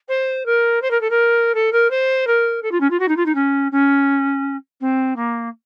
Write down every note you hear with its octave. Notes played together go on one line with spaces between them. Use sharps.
C5
A#4
C5
A#4
A4
A#4
A4
A#4
C5
A#4
A4
F4
C#4
F4
F#4
D#4
F4
D#4
C#4
C#4
C4
A#3